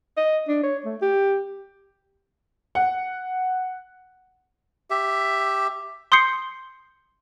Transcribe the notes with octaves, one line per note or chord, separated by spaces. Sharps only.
D#5
D4
C#5
A3
G4
F#5
G4 E5
C6 D#6 G6 C7 C#7